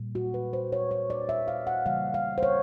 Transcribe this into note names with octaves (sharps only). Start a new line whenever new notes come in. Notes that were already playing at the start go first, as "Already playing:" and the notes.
Already playing: A#2 G3 A#3
F#4
B4
C5
C#5
C#5
D5
E5
F5
F#5
C#3 E3 G3 A#3 F5
F5
C5
C#5